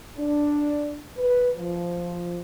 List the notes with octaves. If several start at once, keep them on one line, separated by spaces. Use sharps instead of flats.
D4
B4
F3